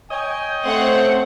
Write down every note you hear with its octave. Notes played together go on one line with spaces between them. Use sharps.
C#5 D#5 G5 G#5
A3 C4 C5 F#5